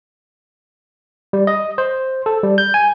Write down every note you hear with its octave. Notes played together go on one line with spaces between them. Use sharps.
G3
D#5
C5
A4
G3
G6
G#5